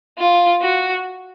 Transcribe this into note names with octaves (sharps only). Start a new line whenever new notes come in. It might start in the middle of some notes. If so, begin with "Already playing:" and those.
F4
F#4